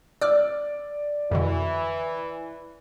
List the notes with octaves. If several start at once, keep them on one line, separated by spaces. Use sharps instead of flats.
D5 D6 E6 F6
F2 B2 D3 E3